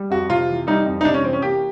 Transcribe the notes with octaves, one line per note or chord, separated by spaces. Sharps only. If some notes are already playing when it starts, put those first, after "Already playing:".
Already playing: G3
F2 F#4
C3 F4
E3
G3 D#4
F2
D#4
C3 D4
C#4
E3 C4
C#4
A#3 G4